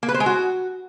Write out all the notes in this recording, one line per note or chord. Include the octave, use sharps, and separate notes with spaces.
A#3
B4
C5
G#3
F#4